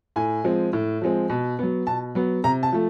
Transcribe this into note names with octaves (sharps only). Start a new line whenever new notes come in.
A2 G#5
F3 G#3 C4
A2
F3 G#3 C4
B2
F#3 B3
B2 A5
F#3 B3
C3 A#5
A5
F3 A3